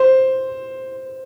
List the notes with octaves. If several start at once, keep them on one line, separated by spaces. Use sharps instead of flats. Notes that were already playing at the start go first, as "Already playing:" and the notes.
Already playing: C5